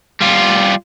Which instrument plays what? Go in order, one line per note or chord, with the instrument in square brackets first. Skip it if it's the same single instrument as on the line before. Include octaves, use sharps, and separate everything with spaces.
[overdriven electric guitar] G3 F4